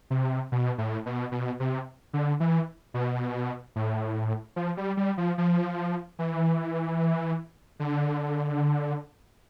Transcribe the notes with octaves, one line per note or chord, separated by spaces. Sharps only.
C3
B2
A2
B2
B2
C3
D3
E3
B2
A2
F3
G3
G3
F3
F3
E3
D3